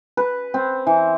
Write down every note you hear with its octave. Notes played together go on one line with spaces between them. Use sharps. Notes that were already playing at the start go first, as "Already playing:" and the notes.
B4
C4
E3